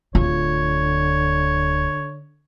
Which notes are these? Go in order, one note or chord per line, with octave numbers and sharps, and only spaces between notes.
D1 D3 F4 C#5